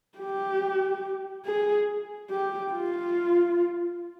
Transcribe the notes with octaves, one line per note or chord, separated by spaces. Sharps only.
G4
G#4
G4
F4